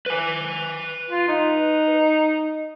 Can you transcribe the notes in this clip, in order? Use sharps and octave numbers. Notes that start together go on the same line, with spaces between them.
B4 G#5
F4
D#4